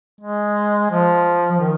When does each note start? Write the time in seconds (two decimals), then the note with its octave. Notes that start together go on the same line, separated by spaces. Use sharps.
0.21 G#3
0.91 F3
1.51 F3
1.60 D#3